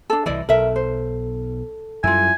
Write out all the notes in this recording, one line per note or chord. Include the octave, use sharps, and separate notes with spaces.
D4 A4
C2 E3 E4 D5 D#5
B1 A4 A#4 E5
C5
F#2 F#3 G3 E4 F4 G#5